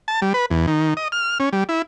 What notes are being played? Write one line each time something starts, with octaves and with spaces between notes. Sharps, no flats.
A5
G3
B4
E2
D#3
D#5
F6
C#4
G3
E4